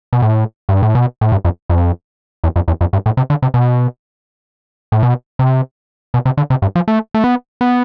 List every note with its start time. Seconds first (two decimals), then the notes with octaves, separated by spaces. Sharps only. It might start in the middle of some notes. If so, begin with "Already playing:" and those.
0.13 B2
0.22 A2
0.69 G2
0.83 A2
0.95 B2
1.21 A2
1.32 G2
1.45 F2
1.70 F2
2.44 E2
2.56 F2
2.68 E2
2.81 F2
2.93 G2
3.06 A2
3.17 C3
3.30 D3
3.42 C3
3.54 B2
4.92 A2
5.03 B2
5.39 C3
6.14 B2
6.25 C3
6.37 D3
6.50 C3
6.62 G2
6.75 F3
6.88 A3
7.14 A3
7.24 B3
7.61 B3